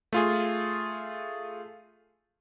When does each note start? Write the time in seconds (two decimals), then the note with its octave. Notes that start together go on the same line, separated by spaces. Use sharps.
0.13 A3 F4 G#4